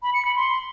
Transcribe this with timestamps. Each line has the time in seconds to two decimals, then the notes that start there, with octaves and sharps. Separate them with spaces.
0.03 B5
0.14 C#7
0.25 B5
0.36 C6